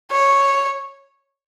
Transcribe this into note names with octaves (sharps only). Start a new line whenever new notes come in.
C#5